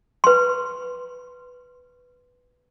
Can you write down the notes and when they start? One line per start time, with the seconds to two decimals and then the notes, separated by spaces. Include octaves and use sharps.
0.24 B4 C6